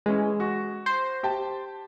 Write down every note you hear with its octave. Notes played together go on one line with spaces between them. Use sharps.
E3 G#3 C#4
F#4 C#6
C5
G4 G5 A5